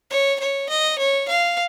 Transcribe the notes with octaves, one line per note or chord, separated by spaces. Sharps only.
C#5
C#5
D#5
C#5
F5